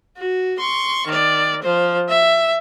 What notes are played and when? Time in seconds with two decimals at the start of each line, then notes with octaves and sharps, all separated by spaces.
0.17 F#4
0.59 C6 C#6
1.07 D#3 D5
1.62 F3 C5
2.08 E5